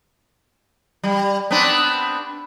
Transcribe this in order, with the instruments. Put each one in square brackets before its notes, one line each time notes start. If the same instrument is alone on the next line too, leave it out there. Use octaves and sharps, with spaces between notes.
[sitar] G3
B3 C4 D4